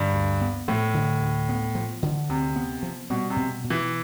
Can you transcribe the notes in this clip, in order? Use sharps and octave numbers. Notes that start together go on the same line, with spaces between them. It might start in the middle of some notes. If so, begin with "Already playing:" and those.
Already playing: G2 D3
D2
B3
A2 F3
D3
D2
B3
F3
D3
D2 C3
B3
F3
B2 G3
C3
B2
B2
E3